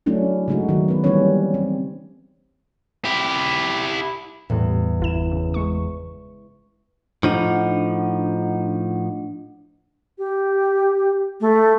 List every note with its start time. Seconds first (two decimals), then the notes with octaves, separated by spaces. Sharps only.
0.06 F#3 A3 C#4 D4 E4
0.48 C#3 G#3 A3 D#4 F#4
0.69 D#3 F#3
0.88 B3 B4
1.04 E3 G3 A#3 C4 C#4 C#5
1.54 C4
3.05 E4 G4
4.50 E2 A2 G3
5.00 G1 E4 E7
5.32 C#3
5.54 G#3 C#6
7.23 A2 F3 D4 D#4 F#5
10.18 G4
11.41 A3